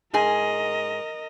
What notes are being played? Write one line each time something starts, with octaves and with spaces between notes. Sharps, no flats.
G#2 G#4 A#4 D#5 G#5